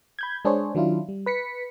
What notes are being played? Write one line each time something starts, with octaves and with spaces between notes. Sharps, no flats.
B5 G6 G#6
G#3 D4 G#4 C5 C#5
D#3 F#3 D4 E4 F4
G3
B4 B6 C#7